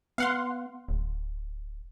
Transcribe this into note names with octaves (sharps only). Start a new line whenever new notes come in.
B3 F5 F#5 C6
D1